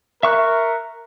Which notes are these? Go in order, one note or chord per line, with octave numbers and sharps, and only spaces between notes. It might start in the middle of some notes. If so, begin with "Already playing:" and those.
A#4 E5 C#6 F#6